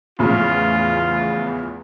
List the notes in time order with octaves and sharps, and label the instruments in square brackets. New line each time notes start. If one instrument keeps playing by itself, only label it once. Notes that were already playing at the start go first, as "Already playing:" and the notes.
[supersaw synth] E2 [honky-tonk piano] A2 C#3 F3 [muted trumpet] F4